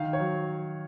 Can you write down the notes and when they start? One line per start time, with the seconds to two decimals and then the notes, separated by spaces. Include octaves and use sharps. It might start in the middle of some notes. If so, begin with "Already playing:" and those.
Already playing: D#3 F5
0.13 C#5
0.19 F#3